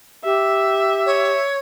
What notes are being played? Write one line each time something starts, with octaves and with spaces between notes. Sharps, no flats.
G4 E5
C#5